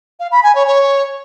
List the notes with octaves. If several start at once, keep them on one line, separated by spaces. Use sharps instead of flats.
F5
B5
G#5
C#5
C#5